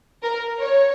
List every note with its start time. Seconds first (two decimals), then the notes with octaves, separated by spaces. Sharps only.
0.23 A#4
0.60 C#5